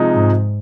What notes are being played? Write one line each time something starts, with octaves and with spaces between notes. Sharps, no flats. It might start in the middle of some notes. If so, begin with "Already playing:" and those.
Already playing: C3 F3 G#3 D#4
G#2